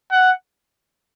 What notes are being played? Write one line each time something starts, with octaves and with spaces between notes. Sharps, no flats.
F#5